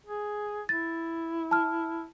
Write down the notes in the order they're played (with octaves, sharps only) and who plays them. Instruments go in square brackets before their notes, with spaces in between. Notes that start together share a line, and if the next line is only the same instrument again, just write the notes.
[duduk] G#4
[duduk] E4 [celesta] A6
[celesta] A5 F6